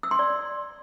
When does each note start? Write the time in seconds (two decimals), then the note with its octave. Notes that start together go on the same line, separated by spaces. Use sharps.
0.03 E6
0.11 C6
0.19 D5